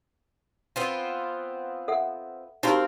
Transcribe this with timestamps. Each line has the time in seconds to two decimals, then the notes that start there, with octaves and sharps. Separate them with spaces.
0.76 B3 C4 F4
1.88 A4 E5 F#5
2.63 C4 D#4 F#4 G4 A#4 F5